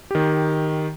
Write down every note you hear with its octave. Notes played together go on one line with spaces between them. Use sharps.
D#3 G4